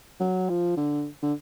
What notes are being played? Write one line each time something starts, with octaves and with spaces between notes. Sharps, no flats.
F#3
F3
D3
D3